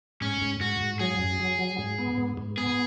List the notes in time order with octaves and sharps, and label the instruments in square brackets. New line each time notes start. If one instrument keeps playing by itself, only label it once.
[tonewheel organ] G#2 [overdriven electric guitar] C#4
[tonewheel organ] G#2
[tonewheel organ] G#2 [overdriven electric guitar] F#4
[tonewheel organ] G#2
[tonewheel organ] F#3 [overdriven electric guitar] G#4
[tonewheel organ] F#2
F#3
F#3
G#2
B3
G#2
G#2
[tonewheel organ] B3 [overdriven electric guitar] G#4